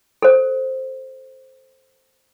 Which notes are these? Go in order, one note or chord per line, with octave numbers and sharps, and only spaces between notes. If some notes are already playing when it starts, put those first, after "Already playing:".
A4 C5